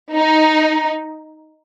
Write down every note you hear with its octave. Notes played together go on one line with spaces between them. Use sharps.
D#4